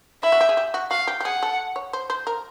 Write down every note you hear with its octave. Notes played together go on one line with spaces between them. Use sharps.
E4 E5
F#4
G4
G#4
G4
F#4
F#4 F5
G4
G4
G#4 F#5
A4
C#5
C5
C5
A#4